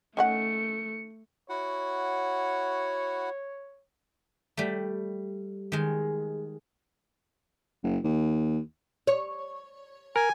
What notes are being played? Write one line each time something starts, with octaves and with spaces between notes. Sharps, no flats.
D#3 A3 C#4 F#5 C#7
E4 F#4 C#5 F#5
G3 A3
D#3 G#3
F#1
D#2
C#5
A#4 G#5